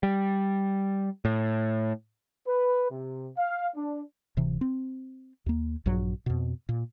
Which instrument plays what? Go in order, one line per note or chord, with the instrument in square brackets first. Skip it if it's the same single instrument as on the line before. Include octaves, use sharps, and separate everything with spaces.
[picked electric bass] G3
A2
[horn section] B4
C3
F5
D4
[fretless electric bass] D1 C3 E3
C4
D#2 A#3
A#1 G2 F#3
F2 B2
A#2